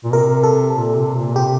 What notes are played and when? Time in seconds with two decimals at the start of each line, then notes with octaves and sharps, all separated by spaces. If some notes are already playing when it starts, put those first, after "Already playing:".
0.04 A#2
0.13 C3 A#4
0.43 A4
0.75 A#2
0.95 C3
1.15 A#2
1.36 C3 G4